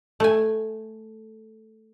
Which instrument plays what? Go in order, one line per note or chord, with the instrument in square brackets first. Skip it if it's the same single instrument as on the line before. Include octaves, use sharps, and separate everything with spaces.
[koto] A3 G#5